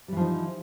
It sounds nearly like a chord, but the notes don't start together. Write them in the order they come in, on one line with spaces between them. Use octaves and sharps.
G3 E3 F3 D#4